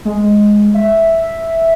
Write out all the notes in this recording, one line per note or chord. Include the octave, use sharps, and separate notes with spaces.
G#3
E5